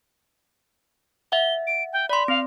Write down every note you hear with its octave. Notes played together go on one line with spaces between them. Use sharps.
E5 F#5 G7
D7
G5
D5 B5 C6
C4 F5